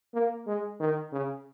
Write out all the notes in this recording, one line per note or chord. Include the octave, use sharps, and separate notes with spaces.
A#3
G#3
D#3
C#3